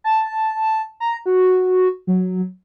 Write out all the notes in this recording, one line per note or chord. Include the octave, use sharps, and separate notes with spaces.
A5
A#5
F#4
F#3